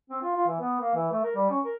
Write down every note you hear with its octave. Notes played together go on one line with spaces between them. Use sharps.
C4
F4
F4
E3
B3
A#3
E3
A3
A#4
G3
C#4
A#4